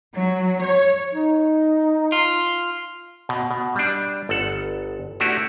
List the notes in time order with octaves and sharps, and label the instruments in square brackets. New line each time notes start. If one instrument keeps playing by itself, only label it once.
[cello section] F#3
C#5
[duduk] D#4
[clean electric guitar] F4
[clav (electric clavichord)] B2
B2
G3 D4
G1 A4 F#5
A3 D4 E4 F#4 G4